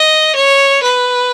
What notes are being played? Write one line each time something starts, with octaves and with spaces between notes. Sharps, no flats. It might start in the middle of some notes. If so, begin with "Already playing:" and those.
Already playing: D#5
C#5
B4